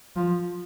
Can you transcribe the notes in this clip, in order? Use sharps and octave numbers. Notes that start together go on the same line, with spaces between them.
F3